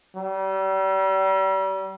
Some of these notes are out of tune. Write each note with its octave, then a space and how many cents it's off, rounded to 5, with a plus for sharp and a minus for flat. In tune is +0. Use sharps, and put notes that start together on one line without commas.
G3 -35